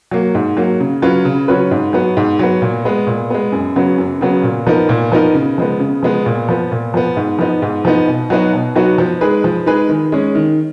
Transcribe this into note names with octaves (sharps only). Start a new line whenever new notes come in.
F#3 A#3
G#2
F#3 A#3
C#3
F#3 C#4 F4 B4
C#3
F#3 C#4 F4 B4
G#2
F#3 B3
G#2
F#3 B3
A#2
G#3 B3
A#2
G#3 B3
F#2
C#3 F#3 B3
F#2
C#3 F#3 B3
A#2
F3 B3 D#4 A#4
A#2
F3 B3 D#4 A#4
C#3
F3 G#3 B3
C#3
F3 G#3 B3
A#2
F3 B3
A#2
F3 B3
G#2
F3 B3 D#4
G#2
F3 B3 D#4
B2
F#3 B3 D#4 F#4
B2
F#3 B3 D#4 F#4
F3
G#3 D#4 G#4 B4
F3
G#3 D#4 G#4 B4
D#3
G#3 C#4
D#3